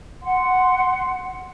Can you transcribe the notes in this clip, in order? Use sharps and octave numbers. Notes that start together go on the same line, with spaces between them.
F#5 C6